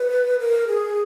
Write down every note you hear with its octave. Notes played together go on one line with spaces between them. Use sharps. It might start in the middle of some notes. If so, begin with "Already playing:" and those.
Already playing: B4
A#4
G#4